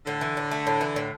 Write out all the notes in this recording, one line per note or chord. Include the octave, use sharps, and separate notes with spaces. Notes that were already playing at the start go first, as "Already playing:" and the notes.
A2 D3
E3
A2
A3
A2
E3
A2